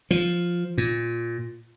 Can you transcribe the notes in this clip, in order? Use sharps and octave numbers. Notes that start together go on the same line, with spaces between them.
F3
A#2